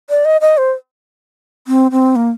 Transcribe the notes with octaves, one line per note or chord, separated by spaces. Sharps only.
D5
D#5
D#5
C5
C4
C4
A#3